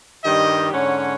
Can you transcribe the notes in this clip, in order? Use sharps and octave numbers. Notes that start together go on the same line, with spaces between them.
G2 D#3 G3 G4 D#5
G#2 D3 C#4 C#5 F#5